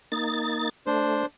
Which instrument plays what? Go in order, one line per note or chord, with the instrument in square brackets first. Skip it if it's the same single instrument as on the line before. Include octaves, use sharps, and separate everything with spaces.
[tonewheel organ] A#3 D#4 A6
[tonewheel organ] A3 [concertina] D4 C5